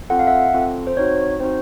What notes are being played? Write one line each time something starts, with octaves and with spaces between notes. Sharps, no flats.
C4 F4 A4 F#5
F5
E5 F#5
C4 F4 A4
C5
C4 D#4 F#4 C#5
C4 D#4 F#4 C5